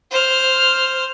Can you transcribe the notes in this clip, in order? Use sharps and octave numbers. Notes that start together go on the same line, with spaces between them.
C5 F6